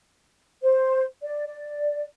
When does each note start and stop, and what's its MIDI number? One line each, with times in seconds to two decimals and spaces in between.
0.63 1.04 72
1.22 1.44 74
1.46 2.03 74